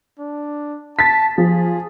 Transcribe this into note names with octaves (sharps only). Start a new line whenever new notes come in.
D4
A5 A6 B6
F3 G#4